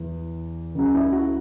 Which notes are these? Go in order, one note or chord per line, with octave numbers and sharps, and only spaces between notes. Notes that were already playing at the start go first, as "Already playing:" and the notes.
Already playing: E2 E3
C#2 C#3 F#3
E4
F#4